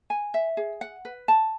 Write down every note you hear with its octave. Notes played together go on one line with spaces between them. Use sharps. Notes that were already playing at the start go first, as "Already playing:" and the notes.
G#5
E5
G#4
F#5
B4
A5